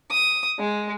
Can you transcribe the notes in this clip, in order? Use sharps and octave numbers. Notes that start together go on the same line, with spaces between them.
D#6
G#3